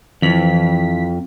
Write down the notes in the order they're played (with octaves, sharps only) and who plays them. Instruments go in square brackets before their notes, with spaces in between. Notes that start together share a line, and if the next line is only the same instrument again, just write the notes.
[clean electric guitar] F2 [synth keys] E3 B6